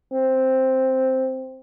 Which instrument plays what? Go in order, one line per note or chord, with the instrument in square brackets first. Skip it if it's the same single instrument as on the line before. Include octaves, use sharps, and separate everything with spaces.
[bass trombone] C4